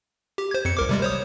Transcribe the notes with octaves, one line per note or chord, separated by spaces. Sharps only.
G4
C5 G#6
F2 C#7
C2 A#4 D6
C3 G3 G#3
C5 C#5 D#6